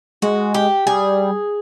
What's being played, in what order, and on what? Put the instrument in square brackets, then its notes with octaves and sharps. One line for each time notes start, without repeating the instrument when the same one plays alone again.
[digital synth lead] G#3 [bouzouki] F#4
[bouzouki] G4
[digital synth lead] G3 [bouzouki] G#4